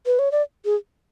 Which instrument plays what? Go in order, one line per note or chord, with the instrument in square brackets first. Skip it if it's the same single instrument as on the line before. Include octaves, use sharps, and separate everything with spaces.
[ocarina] B4
C#5
D5
G#4